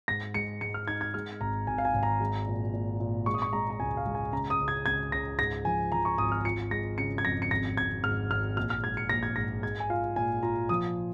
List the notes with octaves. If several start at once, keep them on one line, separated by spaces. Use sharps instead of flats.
G#2 A#6
G#3 C#7
G#2 C#7
F6
D#4 G#6
G#6
G#3 F6
G#1 A#5
G#1 G#5
F5
G#5
G#1
A#5
G#3
A#2
A#2
A#2
G#3 C#6
D#6
C#6
G#3 A#5
A#5
C#2 G#5
F5
G#3
G#5
C#3 A#5
D#6
C#2
G#6
C#2 G#6
C#2 A#6
G#2 A#6
F3 G#5
F3 A#5
C#6
G#1 D#6
F6
F4 C#7
G#3 A#6
C#3 C#7
G#6
F2 A#6
C#7
G#1 A#6
G#1 G#6
G#2 F6
G#1 F6
A#1 F6
F6
G#2 G#6
C#7
A#1 A#6
G#6
G#2 A#6
G#3 G#6
G#5
F4 F5
A#2 G#5
F4 A#5
F3 D#6